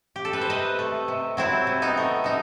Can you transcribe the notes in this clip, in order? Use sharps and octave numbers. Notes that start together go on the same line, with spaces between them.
G4
A4
B4
C5
C3 B4 D#5
A3
C3
F#3 C4 E4
C3
B3 D#4
A3
C3 D#4